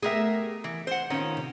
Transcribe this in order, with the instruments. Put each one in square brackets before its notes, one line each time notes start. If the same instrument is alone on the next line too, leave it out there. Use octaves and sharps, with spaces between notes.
[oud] A3 B3 G4 [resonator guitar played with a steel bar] G#4 A#4 E5
[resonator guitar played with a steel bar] E3
C5 F#5
[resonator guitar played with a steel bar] D#3 C#4 [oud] B3 F4
[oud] C3